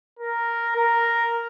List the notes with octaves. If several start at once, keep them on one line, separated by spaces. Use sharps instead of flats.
A#4
A#4